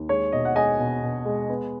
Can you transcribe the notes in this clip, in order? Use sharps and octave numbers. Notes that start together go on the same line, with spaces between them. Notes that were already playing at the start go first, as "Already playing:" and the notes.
Already playing: D#2
G#3 C#5
B2 D#5
F#5
G#3 D#5 G#5
B2
B2
G#3
B3